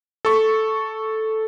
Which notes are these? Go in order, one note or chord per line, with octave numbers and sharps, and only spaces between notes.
A4 C#6